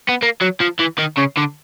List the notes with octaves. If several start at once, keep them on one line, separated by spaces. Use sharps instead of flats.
B3
A#3
F#3
F3
E3
D#3
C#3
D3